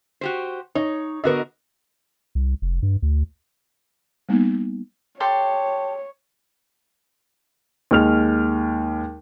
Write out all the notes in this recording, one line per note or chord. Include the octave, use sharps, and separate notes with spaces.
F#4 G4 C5
D#4 C#5
D3 B3 F#4 A#4 D#5
C2
F1
G2
D2
G3 A#3 B3 D#4
G4 A4 C#5 C6
D#2 G#3 F6 F7